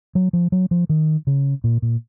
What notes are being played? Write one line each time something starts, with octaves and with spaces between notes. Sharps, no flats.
F#3
F3
F#3
F3
D#3
C#3
A#2
A#2